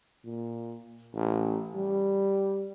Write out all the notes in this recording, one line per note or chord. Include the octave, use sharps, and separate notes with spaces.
A#2
A1
G3